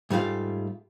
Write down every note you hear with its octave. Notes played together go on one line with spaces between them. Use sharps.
G#2 G3 A3 F4 F5